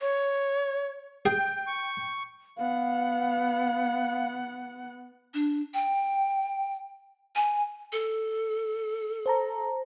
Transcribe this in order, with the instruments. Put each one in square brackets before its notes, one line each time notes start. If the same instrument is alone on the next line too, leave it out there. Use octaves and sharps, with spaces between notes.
[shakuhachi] C#5
[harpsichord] G#4 [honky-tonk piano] G5
[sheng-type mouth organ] C#6
[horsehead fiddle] B3 F#5 [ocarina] F5
[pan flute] D4
G5
G#5
A4
[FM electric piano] C5 A5 A#5